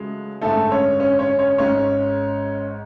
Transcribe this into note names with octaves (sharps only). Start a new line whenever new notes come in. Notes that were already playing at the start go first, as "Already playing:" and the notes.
Already playing: C#2 C#3 F#3 G#3 A3
G#1 F#2 D3 G#3 A3 A4
C#4 C#5
C#4 C#5
C#4 C#5
C#4 C#5
G#1 G#2 G#3 C#4 C#5